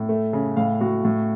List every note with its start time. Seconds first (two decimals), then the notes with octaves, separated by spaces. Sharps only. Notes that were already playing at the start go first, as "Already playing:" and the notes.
Already playing: A2
0.09 A3
0.33 C#3
0.57 A2 F5
0.81 A2 F#4
1.05 A2